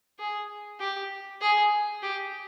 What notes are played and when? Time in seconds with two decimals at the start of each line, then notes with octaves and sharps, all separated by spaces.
0.19 G#4
0.80 G4
1.41 G#4
2.02 G4